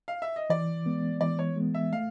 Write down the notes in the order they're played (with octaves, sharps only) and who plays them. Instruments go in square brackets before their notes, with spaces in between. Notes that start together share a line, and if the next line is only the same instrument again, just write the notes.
[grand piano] F5
E5
D#5
[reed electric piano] E3 [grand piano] D5
[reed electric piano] G#3 B3
[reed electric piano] E3 [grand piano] D5
[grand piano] C#5
[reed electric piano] G#3 B3
[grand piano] E5
[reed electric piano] A3 [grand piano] F5